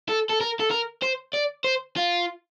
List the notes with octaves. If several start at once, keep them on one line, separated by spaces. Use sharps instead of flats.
A4
A4
A#4
A4
A#4
C5
D5
C5
F4